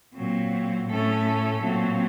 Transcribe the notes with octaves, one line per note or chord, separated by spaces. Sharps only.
A#2 F#3 C4
A2 A3 C#4 A4
A#2 F#3 C4